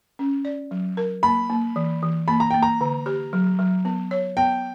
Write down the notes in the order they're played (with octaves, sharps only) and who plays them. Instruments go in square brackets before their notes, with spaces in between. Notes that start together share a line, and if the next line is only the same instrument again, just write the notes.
[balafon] C#4
D5
F#3
A#4
[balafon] A#3 [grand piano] B5
[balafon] A#3
E3
E3
[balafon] A#3 [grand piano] B5
[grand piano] A#5
[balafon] A#3 [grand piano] G5
[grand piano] A#5
[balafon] D3
G4
F#3
F#3
B3
C#5
[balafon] B3 [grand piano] G5